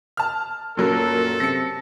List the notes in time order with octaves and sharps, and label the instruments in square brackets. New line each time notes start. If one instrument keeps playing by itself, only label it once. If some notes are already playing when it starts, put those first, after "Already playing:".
[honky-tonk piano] A5 F6
[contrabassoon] F#2 [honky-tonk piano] A#2 F#3 A#4 [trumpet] A4
[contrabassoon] C3 [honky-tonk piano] A#6 C#7